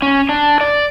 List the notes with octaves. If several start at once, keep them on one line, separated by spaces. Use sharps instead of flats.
C#4
D4
D5